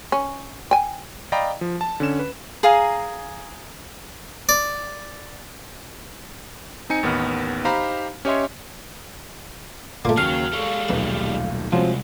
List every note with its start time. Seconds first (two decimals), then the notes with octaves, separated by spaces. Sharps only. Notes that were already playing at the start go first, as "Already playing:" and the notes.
0.12 C#4
0.71 G5 G#5
1.32 D5 D#5 F5 G5 A#5 B5
1.61 F3
1.81 A5
2.00 D3 C#4 E7
2.19 B4
2.63 G#4 F5 G#5 A#5
4.49 D5
6.89 C4 D#4 G#5 C#7
7.03 A1 D#2 D#3 B3 B5 F6
7.64 D#4 G4 C5 F5 A#5 B5
8.25 C#4 G4 C#5 D#5 E5 C6
10.05 G1 A#2 A3 A#3 F4 A5 D6
10.18 D#2 C#3 F#3 A#3 C#4 F5
10.53 G3 G#3 A4 C#6
10.89 D#1 B1 A3 B4
11.72 C2 F3 F#3 G#3 C4